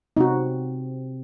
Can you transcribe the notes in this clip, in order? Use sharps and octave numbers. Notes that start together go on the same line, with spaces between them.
C3 C4 D#4 F#4